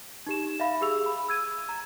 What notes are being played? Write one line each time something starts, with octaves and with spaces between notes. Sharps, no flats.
D#4 G4 E7
E5 F5 B5
G4 G#4 E6 F7
B5
E6 G#6 D#7
A#5